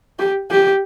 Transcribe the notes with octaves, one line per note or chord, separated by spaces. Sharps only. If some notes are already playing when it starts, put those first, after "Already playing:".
G4
G4